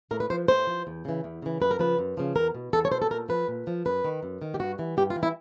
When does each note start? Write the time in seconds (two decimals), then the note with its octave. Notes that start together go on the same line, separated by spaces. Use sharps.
0.11 A2 A#4
0.20 B4
0.30 F3 C5
0.48 A2 C5
0.67 F3
0.87 E2
1.05 C#3 E3
1.24 E2
1.42 C#3 E3
1.60 F#2 B4
1.71 A#4
1.79 C#3 F3 B4
1.99 F#2
2.17 C#3 F3
2.36 E2 A#4
2.55 B2
2.73 E2 A4
2.85 C#5
2.92 B2 C5
3.02 A4
3.10 A#2 A#4
3.29 F3 B4
3.48 A#2
3.67 F3
3.85 F#2 B4
4.04 D#3
4.23 F#2
4.42 D#3
4.54 G4
4.59 G2 F#4
4.79 E3
4.97 G2 G4
5.10 F4
5.16 E3
5.23 E4